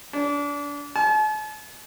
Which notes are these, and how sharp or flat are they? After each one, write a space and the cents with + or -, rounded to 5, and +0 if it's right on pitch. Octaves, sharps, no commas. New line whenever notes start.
D4 -30
A5 -45